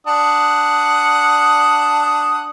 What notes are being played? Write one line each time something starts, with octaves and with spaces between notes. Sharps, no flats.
D4 F#5 D#6